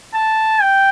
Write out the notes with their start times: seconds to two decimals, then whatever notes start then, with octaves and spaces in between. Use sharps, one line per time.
0.14 A5
0.62 G5